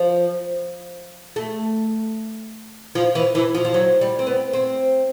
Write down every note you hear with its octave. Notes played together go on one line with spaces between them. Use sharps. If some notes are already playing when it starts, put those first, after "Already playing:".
Already playing: F3
A3
F3
E3
E3
F3
F3
F#3
G3
C4
B3
C4